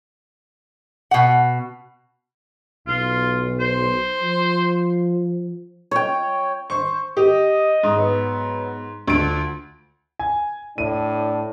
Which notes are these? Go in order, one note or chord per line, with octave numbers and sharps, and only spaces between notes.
B2 F#5
B1 F4
C5
F3
C#5 G5
C5 C#6
G4 D#5
G#2
F#3 B3
D2 D4 F4 D7
G#5
A2 D4 D#7